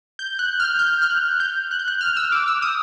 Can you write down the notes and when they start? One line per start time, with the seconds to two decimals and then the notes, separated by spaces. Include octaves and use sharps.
0.19 G6
0.39 F#6
0.60 F6
0.79 G6
1.02 F6
1.10 F#6
1.40 G6
1.71 F#6
1.79 G6
1.88 F#6
2.01 F6
2.17 E6
2.32 D6
2.48 E6
2.62 D#6